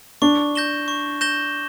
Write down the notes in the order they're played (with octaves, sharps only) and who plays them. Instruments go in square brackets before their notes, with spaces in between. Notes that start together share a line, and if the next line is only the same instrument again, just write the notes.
[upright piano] D4 [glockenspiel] C#6
[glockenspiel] G6 A#6 E7 G7
C#6
G6 A#6 E7 G7